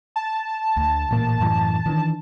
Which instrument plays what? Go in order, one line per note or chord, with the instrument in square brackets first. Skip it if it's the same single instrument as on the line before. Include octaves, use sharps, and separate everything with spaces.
[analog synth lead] A5
[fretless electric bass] D2
A1 A#2 A#3
F#2 A2 E3
D#3 E3 D4